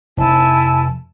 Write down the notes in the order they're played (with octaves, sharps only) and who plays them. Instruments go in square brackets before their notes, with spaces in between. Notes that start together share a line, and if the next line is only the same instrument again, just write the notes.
[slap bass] F1 [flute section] E4 G#5 A5